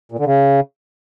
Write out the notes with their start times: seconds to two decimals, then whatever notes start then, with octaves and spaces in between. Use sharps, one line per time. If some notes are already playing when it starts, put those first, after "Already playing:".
0.12 A#2
0.19 D3
0.26 C#3